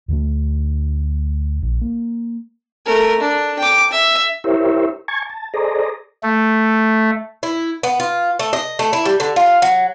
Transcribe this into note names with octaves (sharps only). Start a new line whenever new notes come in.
D2 D3 G3 A3
A#1
A#3
A3 A#4
D4
G5 D6
E5
E4 G4 A#4 C5 C#5 E5
G#5 A5 C#6 G#6
A5
G#4 A4 C5 D5 D#5 A#5
A3
E4
B3
F4
A3
D#5
A3
E4
G3
D3
F4
F#3